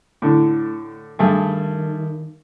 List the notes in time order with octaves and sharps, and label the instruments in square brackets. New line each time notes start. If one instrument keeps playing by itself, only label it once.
[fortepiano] A2 D3 [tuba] A3
[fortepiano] G2 A3 G#4 [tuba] D#3